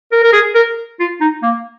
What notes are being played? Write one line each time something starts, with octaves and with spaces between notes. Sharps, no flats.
A#4
A#4
G#4
A#4
F4
D#4
A#3